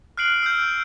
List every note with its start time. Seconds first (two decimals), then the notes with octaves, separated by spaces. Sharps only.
0.17 F6 F#6 C7 D7 F#7
0.43 E6 F6 G6